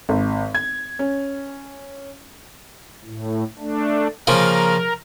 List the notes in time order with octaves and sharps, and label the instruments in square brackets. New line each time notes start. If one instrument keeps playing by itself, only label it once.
[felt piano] G#1
G#6
C#4
[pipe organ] A2
A3 D4
[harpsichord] C#3 F3 A#3 [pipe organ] A#4